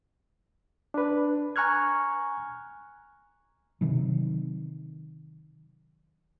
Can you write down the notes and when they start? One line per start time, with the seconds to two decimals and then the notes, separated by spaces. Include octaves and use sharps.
0.94 D4 B4
1.56 G#5 A#5 C#6 F6 F#6 G#6
3.81 C3 D#3 F#3